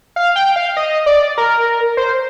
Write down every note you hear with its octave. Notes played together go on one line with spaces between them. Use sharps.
F5
G5
F5
D#5
D5
A#4
C5